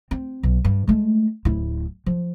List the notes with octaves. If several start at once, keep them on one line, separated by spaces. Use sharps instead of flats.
C4
B1
G2
G#3 A3
D1 E4
F3